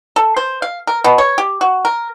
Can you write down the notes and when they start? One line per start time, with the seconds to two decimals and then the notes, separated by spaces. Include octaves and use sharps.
0.16 A4
0.36 C5
0.62 F5
0.87 A#4
1.04 B2
1.18 C#5
1.38 G4
1.61 F#4
1.85 A#4